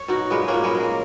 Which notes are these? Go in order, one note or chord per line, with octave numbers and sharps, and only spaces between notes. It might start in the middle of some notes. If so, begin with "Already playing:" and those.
Already playing: C#5
B2 D#4 F#4
A#2 G#3 B3
A#3 C#4
A#2
G#3 B3
F#3
A#3